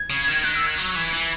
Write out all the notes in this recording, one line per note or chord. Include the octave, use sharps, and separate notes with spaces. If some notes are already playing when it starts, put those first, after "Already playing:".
Already playing: G#6
C#3
D#3
D#3 F#6
E6
G#6
F#3
E3
E3 G#6